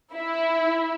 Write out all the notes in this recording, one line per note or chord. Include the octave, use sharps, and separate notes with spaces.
E4